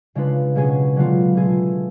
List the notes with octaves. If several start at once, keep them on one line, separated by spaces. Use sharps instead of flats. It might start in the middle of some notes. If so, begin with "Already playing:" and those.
C#3 G#3 D4 F4 B4
B2 G#3 C#4 G#4
D3 F#3 B3 F4
B2 A3 F4 G#4